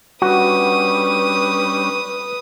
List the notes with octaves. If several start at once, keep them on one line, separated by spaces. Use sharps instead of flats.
G3 C#4 D4 F#4 B4 D#6